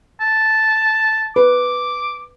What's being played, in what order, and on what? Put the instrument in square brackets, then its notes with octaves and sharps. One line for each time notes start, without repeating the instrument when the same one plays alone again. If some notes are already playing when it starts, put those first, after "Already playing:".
[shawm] A5
[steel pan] B4 [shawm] D6